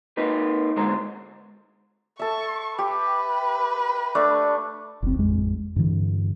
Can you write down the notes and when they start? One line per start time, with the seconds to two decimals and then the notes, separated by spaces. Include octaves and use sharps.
0.17 A#3 D#4 B4
0.76 G#2 B2 D3 G#3 C5 A#5
2.19 A4 E5 C#6
2.79 G4 B4
4.15 A3 D4
5.02 F#1 C2 C4
5.17 A1 F2 G#3
5.76 G2 D3 E3